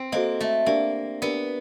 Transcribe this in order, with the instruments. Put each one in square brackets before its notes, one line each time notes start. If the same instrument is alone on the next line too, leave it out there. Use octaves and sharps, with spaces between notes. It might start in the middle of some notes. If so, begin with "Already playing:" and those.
Already playing: [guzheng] C4
[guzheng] A#3 [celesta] F#4 A4 C5 D#5
[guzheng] A3
[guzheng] A#3 [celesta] D4 G4 A#4 D5
[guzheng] B3 [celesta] D4 G4 A#4 D5